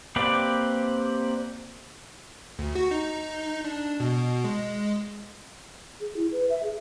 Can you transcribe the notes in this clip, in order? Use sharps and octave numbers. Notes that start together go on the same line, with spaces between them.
A#3 C4 G4 B4 D5
D2
F#4
D#4
D4
B2
G#3
G#4
E4
B4
E5
G#4